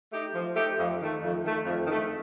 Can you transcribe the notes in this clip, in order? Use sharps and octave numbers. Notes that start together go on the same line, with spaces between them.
A3 D#4 G4
F3
A3 D#4 G4
F2
D#3 A3
F2
D#3 A3
F2
D#3
A3